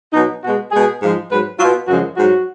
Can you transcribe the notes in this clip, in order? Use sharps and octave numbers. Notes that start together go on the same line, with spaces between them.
B2 F#3 D#4
B2 G#3 F#4
B2 G#3 G#4
G#2 F3 G#3
G#2 F#3 B4
B2 F#3 F4
F#2 C#3 F3 G#3 F#4
G#2 F#3 F#4